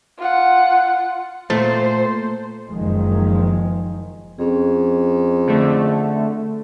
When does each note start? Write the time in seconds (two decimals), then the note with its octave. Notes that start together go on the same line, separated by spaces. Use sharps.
0.19 F4 F#5
1.50 A#2 A3 C5
2.68 F#1 D#3 F3 G#3
4.39 F2 C#4 G#4
5.47 D3 A3